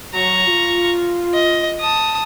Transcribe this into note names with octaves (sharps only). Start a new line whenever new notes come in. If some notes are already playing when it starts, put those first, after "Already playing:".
F#3 A#5 C#6
F4
D#5
A5 D#6